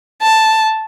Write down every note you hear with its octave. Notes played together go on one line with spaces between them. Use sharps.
A5